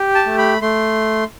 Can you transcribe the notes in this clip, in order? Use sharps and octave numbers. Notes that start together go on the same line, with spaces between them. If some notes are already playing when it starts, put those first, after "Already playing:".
Already playing: G4
A5
A3
B5
A3 C6